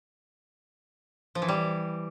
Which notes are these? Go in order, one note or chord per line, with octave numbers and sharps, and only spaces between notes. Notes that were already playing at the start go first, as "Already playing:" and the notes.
F3
E3
G3